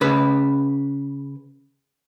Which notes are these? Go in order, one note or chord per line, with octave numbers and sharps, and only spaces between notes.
C#3 B4